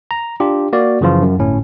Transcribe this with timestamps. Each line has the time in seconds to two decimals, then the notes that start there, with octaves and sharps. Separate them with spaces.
0.11 A#5
0.40 D4 F4 G4
0.73 A#3 F#4 D5
1.01 F#2 C#3 E3 F3 F4
1.23 F#2
1.39 G1 A2 C#4